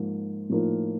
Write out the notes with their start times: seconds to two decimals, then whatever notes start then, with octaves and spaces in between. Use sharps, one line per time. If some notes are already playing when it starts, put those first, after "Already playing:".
Already playing: G#2 F3 A#3
0.50 A2 F3 A#3 D#4